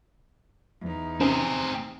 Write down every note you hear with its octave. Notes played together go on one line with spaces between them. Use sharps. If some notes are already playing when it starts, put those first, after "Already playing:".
E2 D#4
C3 C4 C#4 G#4 C5